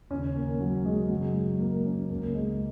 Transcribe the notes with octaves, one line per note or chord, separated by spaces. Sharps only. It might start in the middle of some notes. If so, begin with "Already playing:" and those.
D#2 C#3 C#4
A#3
F#3
G#3
F#2 C#3 F#3
G#3
A#3
C#4
C#2 C#3 A#3
G#3